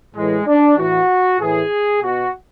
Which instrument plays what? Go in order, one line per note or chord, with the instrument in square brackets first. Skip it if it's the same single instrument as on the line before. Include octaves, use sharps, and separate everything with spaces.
[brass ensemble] A2 E3 G#3
D4
A2 E3 F#4
A2 E3 G#4
B2 F#4